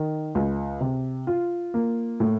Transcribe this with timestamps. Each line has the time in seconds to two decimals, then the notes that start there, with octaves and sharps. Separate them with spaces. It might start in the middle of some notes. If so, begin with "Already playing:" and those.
Already playing: D#3
0.35 C#2
0.81 C3
1.27 F4
1.74 A#3
2.20 A2